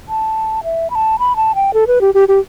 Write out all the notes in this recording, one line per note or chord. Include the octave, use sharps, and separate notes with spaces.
A5
E5
B5
A5
B5
A5
G5
A4
B4
G4
G4
G4